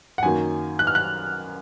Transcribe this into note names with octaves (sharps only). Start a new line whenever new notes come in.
F#5
F#2 D#3 F#3 A#3 G#5
F#6
F6
F#6